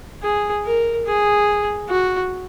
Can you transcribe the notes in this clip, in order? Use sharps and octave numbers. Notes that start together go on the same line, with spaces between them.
G#4
A#4
G#4
F#4